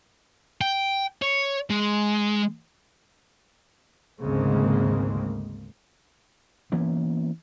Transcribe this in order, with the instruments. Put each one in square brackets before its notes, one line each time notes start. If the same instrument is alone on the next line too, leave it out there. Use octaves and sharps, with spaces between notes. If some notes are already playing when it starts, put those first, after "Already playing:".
[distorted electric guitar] G5
C#5
G#3
[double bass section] G#1 D2 C#3 G#3 A#3 C4
[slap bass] E3 A#3 B3 C#4